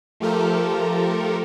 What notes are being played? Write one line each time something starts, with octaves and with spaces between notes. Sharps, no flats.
F3 A3 F4 G4 A4 A#4